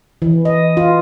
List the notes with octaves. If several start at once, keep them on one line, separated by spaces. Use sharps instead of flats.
E3
D#5
F4